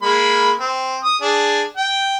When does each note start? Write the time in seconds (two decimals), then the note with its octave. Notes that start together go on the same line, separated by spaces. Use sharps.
0.02 G#3 A#3 B5
0.60 C4
1.04 D#6
1.21 D4 G#4
1.77 G5